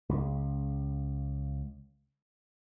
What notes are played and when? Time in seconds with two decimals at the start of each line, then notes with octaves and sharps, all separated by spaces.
0.09 C#2 C#3